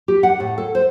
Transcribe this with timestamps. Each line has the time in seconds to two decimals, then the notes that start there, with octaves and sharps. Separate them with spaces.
0.08 G4
0.23 F#5
0.40 A2
0.58 A4
0.75 C5